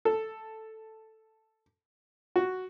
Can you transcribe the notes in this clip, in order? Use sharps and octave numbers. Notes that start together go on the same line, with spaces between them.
A4
F#4